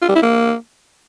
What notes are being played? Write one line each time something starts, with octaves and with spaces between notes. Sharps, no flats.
F4
G3
E4
A#3